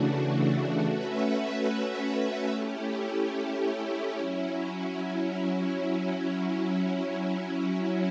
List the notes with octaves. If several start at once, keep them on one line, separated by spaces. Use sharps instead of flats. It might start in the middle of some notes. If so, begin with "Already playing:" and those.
Already playing: C#3 E3 A3 D4 F#4
A3 C#4 F#4 B4 E5
A3 C#4 E4 G4
F#3 C#4 E4